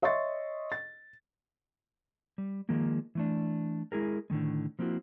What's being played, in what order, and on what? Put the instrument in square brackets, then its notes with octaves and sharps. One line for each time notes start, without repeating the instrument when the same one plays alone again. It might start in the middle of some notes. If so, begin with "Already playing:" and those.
[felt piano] C#5 D#5 E5 C6 C#6 A6
A6
[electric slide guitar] G3
D#3 F3 G#3 A#3
E3 A3 D4
G#3 E4 G#4 A#4
A2 D3 D#3 G#3
F3 A#3 C4 E4 F#4